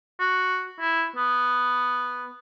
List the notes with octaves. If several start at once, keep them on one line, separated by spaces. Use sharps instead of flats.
F#4
E4
B3